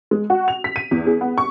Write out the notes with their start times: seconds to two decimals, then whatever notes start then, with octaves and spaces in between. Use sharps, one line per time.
0.11 G#3
0.30 F#4
0.48 F7
0.64 B6
0.76 D#7
0.91 E2
1.06 G#4
1.21 B3
1.38 C#6